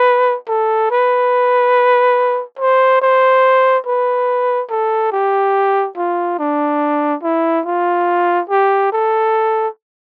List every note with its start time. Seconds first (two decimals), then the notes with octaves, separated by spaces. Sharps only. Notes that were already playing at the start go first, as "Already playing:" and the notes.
Already playing: B4
0.48 A4
0.91 B4
2.59 C5
3.02 C5
3.87 B4
4.70 A4
5.12 G4
5.96 F4
6.39 D4
7.23 E4
7.66 F4
8.49 G4
8.92 A4